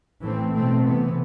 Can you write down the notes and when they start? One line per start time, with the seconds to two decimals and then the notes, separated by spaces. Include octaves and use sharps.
0.21 A2 E3 A3 C4
0.52 B2 A3 C4
0.84 C3 E3 B3